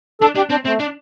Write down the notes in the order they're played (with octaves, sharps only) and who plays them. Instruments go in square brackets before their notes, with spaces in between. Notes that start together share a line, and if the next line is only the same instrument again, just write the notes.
[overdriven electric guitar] D4 [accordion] A4
[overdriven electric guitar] D4 [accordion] G4
[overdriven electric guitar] C4 [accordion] D4
[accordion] A3 [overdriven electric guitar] C4
[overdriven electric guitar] D4